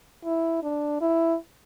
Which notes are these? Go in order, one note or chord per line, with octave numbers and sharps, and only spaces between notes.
E4
D4
E4